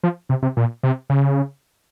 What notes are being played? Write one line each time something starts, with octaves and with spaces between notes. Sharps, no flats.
F3
C3
C3
A#2
C3
C#3